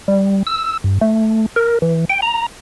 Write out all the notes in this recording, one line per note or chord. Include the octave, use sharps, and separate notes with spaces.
G3
E6
G2
A3
A#4
E3
G5
A#5